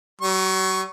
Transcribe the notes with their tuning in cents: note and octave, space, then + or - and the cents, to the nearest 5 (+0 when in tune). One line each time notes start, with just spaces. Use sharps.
F#3 +40 C#6 -5